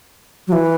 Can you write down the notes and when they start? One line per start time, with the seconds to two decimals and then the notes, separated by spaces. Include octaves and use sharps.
0.47 F#3
0.52 E3